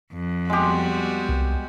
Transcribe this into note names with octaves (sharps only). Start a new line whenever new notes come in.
F2
G3 G#3 B3 F#4 G4
C2